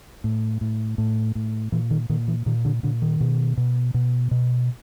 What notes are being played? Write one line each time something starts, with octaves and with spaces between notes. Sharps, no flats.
A2
A2
A2
A2
A#2 E3
D#3
A#2 D#3
E3
A#2 D#3
D3
A#2 D3
D#3
B2
B2
B2
B2